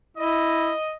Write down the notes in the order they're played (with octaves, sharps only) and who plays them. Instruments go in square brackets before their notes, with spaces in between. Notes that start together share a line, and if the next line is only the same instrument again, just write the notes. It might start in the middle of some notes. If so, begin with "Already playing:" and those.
[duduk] E4 [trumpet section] D#5